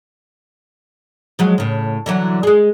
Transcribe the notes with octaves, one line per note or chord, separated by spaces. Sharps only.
F3 F#3 G#3
A2 C#3
D3 E3 F#3
G#3 G#4